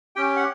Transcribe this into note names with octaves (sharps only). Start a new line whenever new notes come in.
C#4 G4 G5
F#5